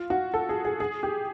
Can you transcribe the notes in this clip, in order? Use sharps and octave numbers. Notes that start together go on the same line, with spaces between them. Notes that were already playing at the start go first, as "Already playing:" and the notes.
Already playing: F4
F#4
A4
G#4
G#4
G#4
G4